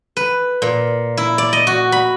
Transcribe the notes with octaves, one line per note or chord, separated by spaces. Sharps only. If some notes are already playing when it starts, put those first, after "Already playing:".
B4
A#2
E4
D5
D#5
F#4
B5